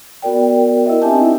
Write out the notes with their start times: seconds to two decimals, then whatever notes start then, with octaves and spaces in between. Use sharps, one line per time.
0.22 B3 F#4 A#4 D5 G5
0.86 E4 A#4 D#5 E5
1.02 C4 D4 E4 G4 G#5 A5
1.14 D#4 E4 E5